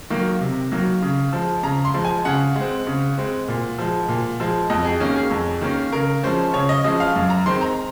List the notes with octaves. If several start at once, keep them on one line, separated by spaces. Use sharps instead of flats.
D#3 F#3 A#3
C3
D#3 F#3 A#3
C#3
F3 G#3
C#3 A#5
C6
F3 G#3
G#5
C#3 F#5
G#3 C4
C#3
G#3 C4
A#2
F3 G#3
A#2
F3 G#3
F2 D#5
G#4
D#3 A#3 C#4
G#4
F2
D#3 A#3 C#4
C#3 A#4
F3 G#3 C#4 C5
C#3 C#5
D#5
F3 G#3 C#4 D#5
F5
F#2
A#5
D#3 G#3 C4 C6
A#5